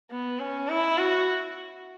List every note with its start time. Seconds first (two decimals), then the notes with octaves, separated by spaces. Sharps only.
0.11 B3
0.39 C#4
0.69 E4
0.97 F#4